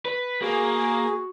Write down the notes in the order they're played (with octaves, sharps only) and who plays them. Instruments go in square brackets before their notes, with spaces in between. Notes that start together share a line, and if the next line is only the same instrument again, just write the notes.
[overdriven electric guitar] B4
[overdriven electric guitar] A#3 [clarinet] F#4 [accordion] G#4